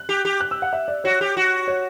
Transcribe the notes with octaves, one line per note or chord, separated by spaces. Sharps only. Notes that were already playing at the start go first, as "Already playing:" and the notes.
Already playing: F#6
G4
G4
F#6
E6
F#5
E5
D5
F#4 C#5
G4
F#4
C#5